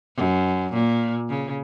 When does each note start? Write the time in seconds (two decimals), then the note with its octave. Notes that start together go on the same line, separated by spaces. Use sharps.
0.16 F#2
0.73 A#2
1.29 C#3